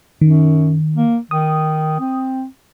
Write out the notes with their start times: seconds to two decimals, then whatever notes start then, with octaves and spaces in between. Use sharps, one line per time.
0.21 F#2 D#3
0.96 A#3
1.31 D#3 D#6
2.00 C4